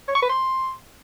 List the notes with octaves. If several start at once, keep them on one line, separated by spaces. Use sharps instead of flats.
C#5
C#6
B4
C6